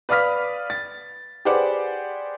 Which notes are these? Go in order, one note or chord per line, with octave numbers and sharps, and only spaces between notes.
B4 D5 F5 D#6 F6 B6
A6
G4 G#4 B4 C5 D5 F#5